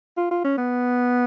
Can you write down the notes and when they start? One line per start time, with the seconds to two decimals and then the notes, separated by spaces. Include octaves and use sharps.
0.17 F4
0.31 F4
0.44 C#4
0.58 B3